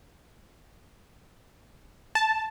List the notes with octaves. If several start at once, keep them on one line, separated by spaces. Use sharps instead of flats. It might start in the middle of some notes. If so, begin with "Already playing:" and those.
A5